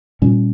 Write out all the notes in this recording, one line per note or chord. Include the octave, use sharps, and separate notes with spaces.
A#2 G3 C#4